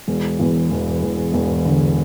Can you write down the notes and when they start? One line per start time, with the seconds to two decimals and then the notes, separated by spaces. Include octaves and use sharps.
0.08 E1
0.40 E2
0.71 E1
1.03 E1
1.34 E1
1.65 D3